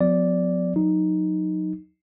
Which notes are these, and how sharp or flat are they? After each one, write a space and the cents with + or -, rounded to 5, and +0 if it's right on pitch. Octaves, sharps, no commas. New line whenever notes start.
F#3 -45 B3 +40 D5 -5
F#3 -25 D#4 +0